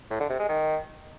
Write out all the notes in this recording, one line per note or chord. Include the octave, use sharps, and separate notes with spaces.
A2
D3
C3
G#3
D#3